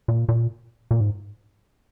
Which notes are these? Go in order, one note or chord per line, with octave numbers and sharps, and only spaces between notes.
A#2
A#2
A#2
G#2